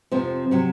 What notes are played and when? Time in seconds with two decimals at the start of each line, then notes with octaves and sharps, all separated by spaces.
0.12 F2 C3 F3 C4
0.51 C3 F#3